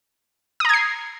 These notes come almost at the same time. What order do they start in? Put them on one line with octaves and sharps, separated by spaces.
D#6 A#5 G#6 C7